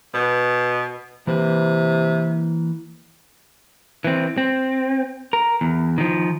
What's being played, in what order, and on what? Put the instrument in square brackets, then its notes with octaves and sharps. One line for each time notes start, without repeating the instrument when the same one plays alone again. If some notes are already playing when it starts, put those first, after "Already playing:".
[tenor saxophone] B2 [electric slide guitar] B4
[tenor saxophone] C3 [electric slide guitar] E3 A#3 B4
[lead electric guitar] E3 C4
C4
A#4
E2
D#3 F3